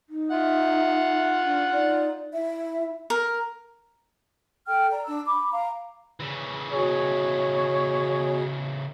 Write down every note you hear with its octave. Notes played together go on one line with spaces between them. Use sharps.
D#4
F4 E5 F#5
D4
D#4 D5
E4 E5
A#4
A4 G5 F6
D5 A#5
D4 E6
B5 D6
F5 A#5
C#3 E3
B2 G#4 C#5